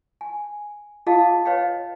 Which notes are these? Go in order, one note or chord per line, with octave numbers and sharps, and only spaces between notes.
G#5
F4 G#4 D#5 F5 A5 D#6
B4 C#5 D#5 F5 G5